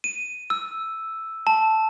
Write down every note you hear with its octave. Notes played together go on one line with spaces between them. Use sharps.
D#7
E6
A5